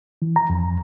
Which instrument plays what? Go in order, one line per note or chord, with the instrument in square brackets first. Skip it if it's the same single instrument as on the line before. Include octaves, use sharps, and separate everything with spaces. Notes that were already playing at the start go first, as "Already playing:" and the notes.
[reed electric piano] E3
A#5
F2